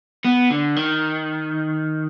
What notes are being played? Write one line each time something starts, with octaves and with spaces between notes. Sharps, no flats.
B3
D3
D#3